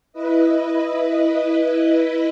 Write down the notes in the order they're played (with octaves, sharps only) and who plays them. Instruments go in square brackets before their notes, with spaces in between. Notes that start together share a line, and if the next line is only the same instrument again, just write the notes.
[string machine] E4 B4 D#5